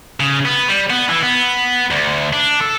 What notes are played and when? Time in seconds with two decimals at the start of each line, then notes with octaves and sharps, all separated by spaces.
0.20 C#3
0.46 B3
0.68 G3
0.90 B3
1.10 E3
1.23 B3
1.91 D2
2.33 D4
2.60 A4